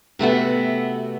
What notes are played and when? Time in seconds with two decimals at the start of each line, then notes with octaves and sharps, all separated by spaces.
0.19 C3 A3 B3 F#4